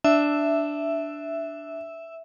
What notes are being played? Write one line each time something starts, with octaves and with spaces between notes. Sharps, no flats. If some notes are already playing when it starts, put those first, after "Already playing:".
D4 E5